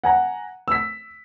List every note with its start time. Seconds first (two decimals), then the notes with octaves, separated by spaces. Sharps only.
0.04 F#5 G#5 A#5
0.68 E6 B6